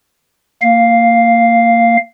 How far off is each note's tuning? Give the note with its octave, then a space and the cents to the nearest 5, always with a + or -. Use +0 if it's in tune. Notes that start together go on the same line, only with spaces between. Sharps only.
A#3 -20 F5 +0